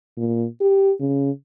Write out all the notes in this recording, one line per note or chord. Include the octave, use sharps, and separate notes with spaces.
A#2
G4
C#3